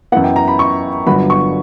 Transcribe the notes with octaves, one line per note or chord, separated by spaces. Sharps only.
F#2 E3 B3 F#5
G5
A#5
B5
C#6
G1 G2 D3 F#3 B3 B5
C#6